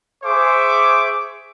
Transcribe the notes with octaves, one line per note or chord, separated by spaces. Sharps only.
G#4 C5 E5 C#6 D6